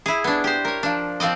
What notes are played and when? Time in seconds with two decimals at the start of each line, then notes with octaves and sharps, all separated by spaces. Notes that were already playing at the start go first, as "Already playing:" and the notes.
0.06 E4 G#4
0.24 B3 D4
0.44 G4 C5
0.65 A#4 C#5
0.83 F3 D4
1.20 F3 C4 D5 D#5